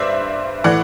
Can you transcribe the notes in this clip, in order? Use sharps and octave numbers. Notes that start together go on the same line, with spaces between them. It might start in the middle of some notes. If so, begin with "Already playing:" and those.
Already playing: G2 B4 C5 D5 E5
A2 E3 D5 F#5